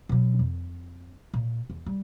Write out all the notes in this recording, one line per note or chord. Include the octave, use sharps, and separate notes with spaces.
B2 F#3
F2
A#2
E2
G3